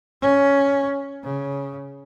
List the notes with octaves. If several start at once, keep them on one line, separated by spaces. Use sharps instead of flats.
C#4
C#3